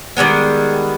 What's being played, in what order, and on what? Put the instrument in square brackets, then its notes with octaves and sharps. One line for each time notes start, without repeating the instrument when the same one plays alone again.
[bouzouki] D#3 G3 G#3 B3